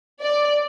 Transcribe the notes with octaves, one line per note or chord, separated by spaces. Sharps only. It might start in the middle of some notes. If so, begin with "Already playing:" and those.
D5